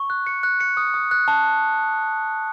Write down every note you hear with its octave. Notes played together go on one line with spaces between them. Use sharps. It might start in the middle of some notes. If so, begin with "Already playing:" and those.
Already playing: C#6
F#6
C#7
F#6
C#7
D#6
D#6
F#6
A5